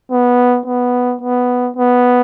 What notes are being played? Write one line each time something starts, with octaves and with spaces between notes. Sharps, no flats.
B3
B3
B3
B3